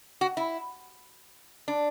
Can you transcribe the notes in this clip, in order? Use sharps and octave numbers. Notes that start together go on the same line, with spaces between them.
F#4
E4
D4